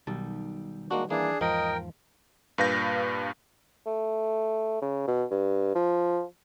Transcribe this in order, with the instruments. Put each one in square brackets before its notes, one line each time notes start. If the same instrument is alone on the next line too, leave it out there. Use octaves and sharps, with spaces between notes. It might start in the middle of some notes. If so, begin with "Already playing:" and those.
[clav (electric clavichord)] B1 A5 [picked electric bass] D#3 G3
[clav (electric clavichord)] G#3 A#3 D4 [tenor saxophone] F#4
[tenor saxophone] E3 [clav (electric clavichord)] A#3 [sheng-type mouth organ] D4 G#4
[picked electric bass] E2 G#2 [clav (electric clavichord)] F3 [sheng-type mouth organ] A#4 G5 [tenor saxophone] D#5
[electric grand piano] G2 A#2 B4 F5 G6 A#6
[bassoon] A3
C#3
B2
G2
F3